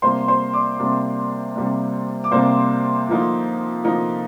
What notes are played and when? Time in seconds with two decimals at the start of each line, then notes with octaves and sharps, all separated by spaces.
0.02 C3 G3 A#3 D4 C5 C6
0.28 C5 C6
0.53 D5 D6
0.79 C3 G3 A#3 D4
1.55 C3 G3 A#3 D4
2.24 D6
2.31 C3 G3 A#3 D4 C5 C6
3.08 D3 F3 A#3 D#4
3.84 D3 F3 A#3 D#4